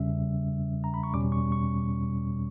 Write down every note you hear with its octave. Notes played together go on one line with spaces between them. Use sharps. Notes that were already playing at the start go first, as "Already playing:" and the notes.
Already playing: E2 C#3 G3 C#4 E5
A#5
B5
C#6
E2 B2 G3 C#4 D6
C#6
C#6